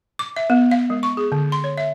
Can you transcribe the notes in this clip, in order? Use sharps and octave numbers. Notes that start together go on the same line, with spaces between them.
D6
E5
B3
F5
G#3
C#6
G#4
D3
C6
C#5
E5